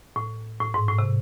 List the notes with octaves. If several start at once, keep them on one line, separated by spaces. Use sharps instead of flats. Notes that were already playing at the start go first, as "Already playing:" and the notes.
A2
A2
G#2
A2
C3